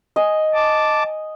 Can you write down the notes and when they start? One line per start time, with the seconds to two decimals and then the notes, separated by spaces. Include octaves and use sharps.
0.16 D#5 G#5
0.54 A5 D6